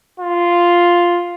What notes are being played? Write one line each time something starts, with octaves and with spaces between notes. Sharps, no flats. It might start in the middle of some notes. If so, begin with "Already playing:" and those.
F4